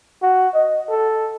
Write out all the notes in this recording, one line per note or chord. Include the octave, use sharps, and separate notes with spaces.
F#4
D#5
A4